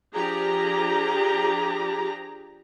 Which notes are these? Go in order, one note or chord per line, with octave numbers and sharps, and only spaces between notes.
F3 D4 G4 G#4 A#5